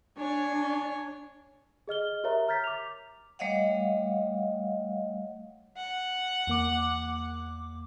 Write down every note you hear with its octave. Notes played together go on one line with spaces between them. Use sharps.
D4 C#5 G#5
G#4 D#5 F6 G7
G4 A#4 C#5 E5 A#5
A#5 F6 G6 A6 B6
D6 F7
G3 A3 C#5 D#5 F5 F#5
F#5
E2 A#3 D6